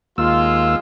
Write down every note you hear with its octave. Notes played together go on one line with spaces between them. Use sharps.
D#2 G#3 A#3 F4 E6